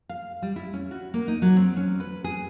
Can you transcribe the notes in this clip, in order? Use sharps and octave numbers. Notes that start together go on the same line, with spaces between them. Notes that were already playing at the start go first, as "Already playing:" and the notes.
F5
G3
E4
C#4
F#4
A#3
D#4
F#3
C4
C#4
B4
G#4